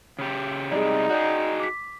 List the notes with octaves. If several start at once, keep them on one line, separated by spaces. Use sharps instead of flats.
C#3 G4
C3 G3 G#3 D#4 G#4 D5
F#4 G#4 D5 G6
D6 B6